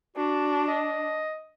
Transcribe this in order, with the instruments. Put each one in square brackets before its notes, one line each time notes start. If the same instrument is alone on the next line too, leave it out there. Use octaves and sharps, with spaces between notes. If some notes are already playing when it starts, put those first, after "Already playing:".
[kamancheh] D4 [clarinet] F#4
[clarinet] D#5